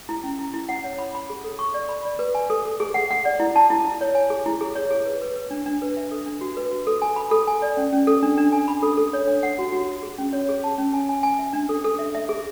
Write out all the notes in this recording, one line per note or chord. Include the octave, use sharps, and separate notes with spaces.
E4
C#4
E4
E4
F#5
C#5
B5
B5
G#4
A4
C#6
D5
B5
D5
B4
G#5
A4
A4
G#4
F#5
F#5
D5
E4
A5
E4
E4
C#5
G#5
G#4
E4
G#4
C#5
G#4
B4
B4
B4
D4
D4
B4
E5
A4
D4
F#4
B4
F#4
A4
G#5
B5
A4
G#5
D5
C#4
C#4
A4
D4
D4
G#5
B5
A4
A4
C#5
D4
F#5
F#4
F#4
F#4
G#4
C#4
C#5
G#4
A5
C#4
G#5
G#5
G#5
E5
D4
A4
A4
E5
E5
G#4